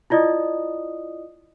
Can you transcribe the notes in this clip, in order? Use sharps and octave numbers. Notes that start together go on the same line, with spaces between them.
E4 F4 D5 D#5 D#6